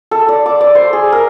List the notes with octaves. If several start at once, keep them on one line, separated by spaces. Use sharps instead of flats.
A4
D5
D6
D5
C5
G#4
A#4